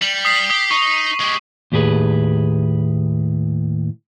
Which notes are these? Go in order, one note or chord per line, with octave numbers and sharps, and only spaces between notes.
G3 F#7
D#6 B6 C7
G4 D#6
D#4 C#6
G#3 G4
D#2 A2 G4 G#4 B4